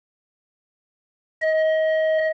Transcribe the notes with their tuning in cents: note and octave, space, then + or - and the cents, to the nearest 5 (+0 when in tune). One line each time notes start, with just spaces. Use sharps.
D#5 +25